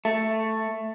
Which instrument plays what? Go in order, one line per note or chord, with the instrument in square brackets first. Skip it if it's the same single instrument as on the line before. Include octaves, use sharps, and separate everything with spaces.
[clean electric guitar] A3